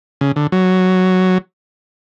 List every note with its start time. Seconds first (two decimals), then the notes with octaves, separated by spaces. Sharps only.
0.21 C#3
0.36 D3
0.52 F#3